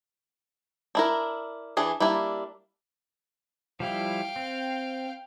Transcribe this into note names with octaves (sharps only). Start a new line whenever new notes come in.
D4 E4 A#4
E3 D4 G#4
G3 A#3 D4 E4
F3 G3 E4 F5 G5
C4